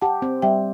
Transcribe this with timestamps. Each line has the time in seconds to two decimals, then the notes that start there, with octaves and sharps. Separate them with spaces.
0.01 G4 F#5 A5
0.22 C4
0.42 G3 E5 G5